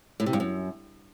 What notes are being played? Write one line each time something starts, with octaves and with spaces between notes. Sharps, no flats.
A2
C3
G2
F#2